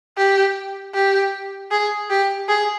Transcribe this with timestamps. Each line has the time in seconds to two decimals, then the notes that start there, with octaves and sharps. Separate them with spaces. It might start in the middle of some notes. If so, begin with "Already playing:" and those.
0.17 G4
0.94 G4
1.71 G#4
2.10 G4
2.48 G#4